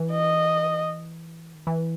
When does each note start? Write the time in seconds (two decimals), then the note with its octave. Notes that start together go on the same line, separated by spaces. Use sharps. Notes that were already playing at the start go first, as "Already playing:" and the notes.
Already playing: E3
0.12 D#5
1.55 D#3
1.67 E3